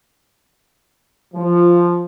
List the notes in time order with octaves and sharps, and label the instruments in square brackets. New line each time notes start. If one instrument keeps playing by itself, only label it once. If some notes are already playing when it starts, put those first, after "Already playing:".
[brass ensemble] F3